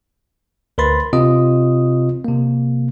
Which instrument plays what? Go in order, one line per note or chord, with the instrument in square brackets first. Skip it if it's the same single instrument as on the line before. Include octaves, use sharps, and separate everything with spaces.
[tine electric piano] D2 A#4 B4 B5 C6 A6
C3 C4 F4 D#5 D#6
C3 A#3